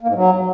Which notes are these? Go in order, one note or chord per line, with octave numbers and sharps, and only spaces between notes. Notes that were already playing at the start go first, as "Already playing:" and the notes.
A#3
G#2
F#3